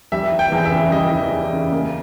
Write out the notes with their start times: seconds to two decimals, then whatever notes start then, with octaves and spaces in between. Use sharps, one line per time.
0.12 G3 E5
0.32 E3
0.39 G5
0.52 E2
0.58 G5
0.65 E5
0.71 C#3
0.92 G3 D#5
1.12 E3
1.32 E2
1.53 C#3
1.72 A#3